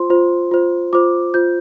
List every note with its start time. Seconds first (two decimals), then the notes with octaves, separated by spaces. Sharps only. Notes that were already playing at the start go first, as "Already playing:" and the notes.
Already playing: F4 C5 C6
0.10 F4 C5
0.51 F4 C5
0.93 F4 C5 D6
1.34 F4 C5 G6